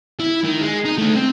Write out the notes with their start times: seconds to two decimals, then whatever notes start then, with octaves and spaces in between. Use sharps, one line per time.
0.20 E4
0.45 D#3
0.62 G#3
0.86 D#4
0.98 A3 D4
1.16 C4